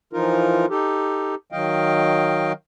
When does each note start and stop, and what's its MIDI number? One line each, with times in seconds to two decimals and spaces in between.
0.13 0.66 52
0.13 0.66 53
0.13 0.66 63
0.13 0.66 65
0.13 0.66 70
0.70 1.35 63
0.70 1.35 67
0.70 1.35 69
1.52 2.52 51
1.52 2.52 54
1.52 2.52 75
1.52 2.52 77
1.52 2.52 79